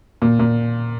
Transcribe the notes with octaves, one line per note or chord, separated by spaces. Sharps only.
A#2
A#2